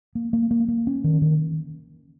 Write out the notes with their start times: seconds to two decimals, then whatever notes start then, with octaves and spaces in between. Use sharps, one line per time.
0.15 A#3
0.33 A#3
0.51 A#3
0.68 A#3
0.87 C#4
1.04 D#3
1.22 D#3